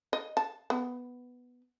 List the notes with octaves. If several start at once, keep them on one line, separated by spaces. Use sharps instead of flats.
D#5
A5
B3